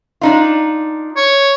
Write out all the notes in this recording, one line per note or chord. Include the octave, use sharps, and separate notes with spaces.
D4 D#4 F4
C#5